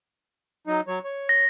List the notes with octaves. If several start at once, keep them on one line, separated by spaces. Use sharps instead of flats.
F#3 D#4
F#3 C#5
C#5
A#6